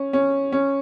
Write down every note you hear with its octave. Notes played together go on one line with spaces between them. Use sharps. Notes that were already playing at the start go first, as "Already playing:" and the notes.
Already playing: C#4
C#4
C#4